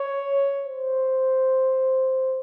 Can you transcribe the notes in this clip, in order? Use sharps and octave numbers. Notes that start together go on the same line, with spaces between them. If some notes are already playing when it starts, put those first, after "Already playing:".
Already playing: C#5
C5